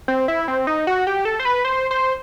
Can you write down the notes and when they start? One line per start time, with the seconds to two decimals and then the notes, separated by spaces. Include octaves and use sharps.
0.08 C4
0.28 E4
0.48 C4
0.67 D#4
0.87 F#4
1.07 G4
1.25 A4
1.40 C5
1.45 B4
1.65 C5
1.91 C5